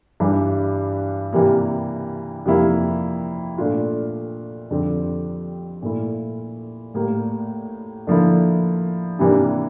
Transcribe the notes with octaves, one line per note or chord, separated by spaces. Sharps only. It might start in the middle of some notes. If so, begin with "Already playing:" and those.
G2 E3 G3 D4 G4
C3 E3 G3 A#3
F2 C3 G3 A#3 E4
A#2 A3 D4 F4
F2 D3 G3 C4 G4
A#2 A3 E4
A2 G3 A#3
D3 F3 A#3 E4
C3 E3 G3 A#3 D4